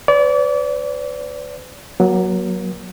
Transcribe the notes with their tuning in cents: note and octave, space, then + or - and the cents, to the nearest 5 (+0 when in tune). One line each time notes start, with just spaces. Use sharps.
B4 +40 D5 -35
F#3 +0 A#3 +35 A#4 +35